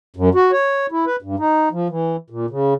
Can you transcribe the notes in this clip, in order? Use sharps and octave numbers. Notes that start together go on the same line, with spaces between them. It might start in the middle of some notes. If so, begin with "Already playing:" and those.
F#2
F#4
C#5
E4
B4
G2
D#4
F3
E3
A#2
C#3